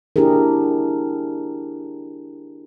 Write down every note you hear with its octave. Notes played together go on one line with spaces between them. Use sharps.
D4 E4 G4 G#4 A#4